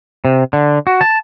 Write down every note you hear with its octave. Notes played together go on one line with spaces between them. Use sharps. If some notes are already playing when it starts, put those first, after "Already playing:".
C3
D3
F#4
A5